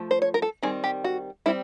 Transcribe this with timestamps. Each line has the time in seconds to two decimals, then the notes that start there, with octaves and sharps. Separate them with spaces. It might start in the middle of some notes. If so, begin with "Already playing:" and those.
Already playing: F3 A3
0.11 C5
0.22 C#5
0.34 A#4
0.42 A4
0.63 D#3 G3 C4 G#4
0.84 G4
1.04 F#4
1.46 G3 C4 E4